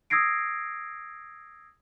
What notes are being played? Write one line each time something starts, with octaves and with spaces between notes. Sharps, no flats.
D#6 E6 G#6 A#6 C7 D7